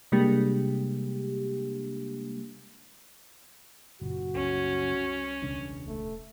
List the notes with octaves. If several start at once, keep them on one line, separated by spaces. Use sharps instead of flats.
C3 G3 G#3 A#3 D4 G4
F#1 A#2 F#4
C2 C#4
E1 C#2 D4
D#1 A3